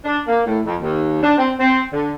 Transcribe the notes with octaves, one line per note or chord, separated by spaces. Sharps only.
D4
A#3
A2
F2
D#2
D4
C4
C4
D3